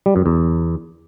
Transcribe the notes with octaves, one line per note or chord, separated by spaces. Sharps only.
G3
F#2
E2